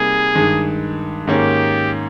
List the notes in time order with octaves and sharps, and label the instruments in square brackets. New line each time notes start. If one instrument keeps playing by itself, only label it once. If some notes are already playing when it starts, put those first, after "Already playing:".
Already playing: [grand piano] C3 G3 A#3 D#4 [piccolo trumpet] G#4
[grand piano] G2 D#3 G#3
[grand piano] G#2 D#3 A#3 C#4 [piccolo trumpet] G4